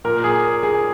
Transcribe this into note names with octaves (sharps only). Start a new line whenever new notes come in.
A#2 A#4
G#4
G#4